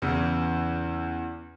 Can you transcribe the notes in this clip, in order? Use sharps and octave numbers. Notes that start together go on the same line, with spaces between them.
E2 C#3 E3